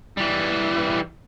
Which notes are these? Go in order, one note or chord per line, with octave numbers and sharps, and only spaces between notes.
E3 G3